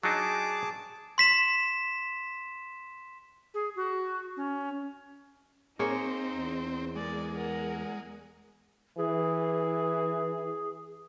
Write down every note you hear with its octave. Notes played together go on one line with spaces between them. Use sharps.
F#3 D4 D#4 G#4 A5 D6
C6 B6 E7
G#4
F#4
C#4
A#3 C4 D#4 G#4 C#5
E2
G#3 A#4 D5
A#4 F#5
E3 G#4